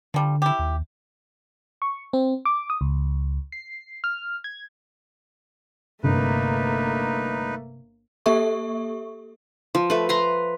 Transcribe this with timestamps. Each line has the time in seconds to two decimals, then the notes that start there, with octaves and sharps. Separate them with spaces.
0.14 D3 F3 G3
0.42 E4 G4
0.59 D#2
1.82 C#6
2.13 C4
2.45 D6
2.70 D#6
2.81 C#2
3.52 C7
4.04 F6
4.44 G#6
6.04 G1 C3 A3 A#3 D#4 B4
8.26 A#3 G4 A4 E5 C#6
9.75 F3
9.90 A3 B4
10.09 B4 A#5 C6